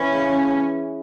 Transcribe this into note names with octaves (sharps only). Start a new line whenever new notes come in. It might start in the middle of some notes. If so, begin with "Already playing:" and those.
Already playing: E3 C#4
C#3